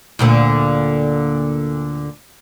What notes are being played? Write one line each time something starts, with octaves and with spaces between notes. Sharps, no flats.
D2 A#2 D3